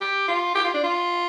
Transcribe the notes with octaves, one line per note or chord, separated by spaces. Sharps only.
G4
F4
G4
F4
D4
F4